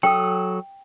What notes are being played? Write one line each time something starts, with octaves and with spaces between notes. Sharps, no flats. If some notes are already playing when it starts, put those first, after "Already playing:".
F#3 A4 G5 D#6